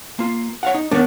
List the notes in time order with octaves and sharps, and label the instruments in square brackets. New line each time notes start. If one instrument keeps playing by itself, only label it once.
[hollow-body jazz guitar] A#3 F4
C#5 F5 F#5
D#4
[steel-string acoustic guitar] D#2 B3 [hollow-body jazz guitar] D4 C#5